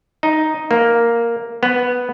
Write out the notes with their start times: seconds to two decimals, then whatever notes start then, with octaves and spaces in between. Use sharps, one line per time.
0.23 D#4
0.71 A#3
1.63 B3